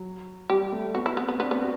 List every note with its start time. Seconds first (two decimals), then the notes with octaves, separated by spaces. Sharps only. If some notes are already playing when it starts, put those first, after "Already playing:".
Already playing: F#3
0.50 G3 G4
0.72 A3
0.95 B3 F#4
1.06 E4
1.17 B3 C4
1.29 B3
1.36 C4
1.40 B3 D4
1.51 B3
1.61 F#4